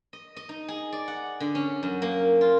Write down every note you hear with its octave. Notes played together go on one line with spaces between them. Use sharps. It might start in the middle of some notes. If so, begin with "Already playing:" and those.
D#5
D#5
D#4
G#4
D5
F#5
D3
C#4
F#2
A#3
F4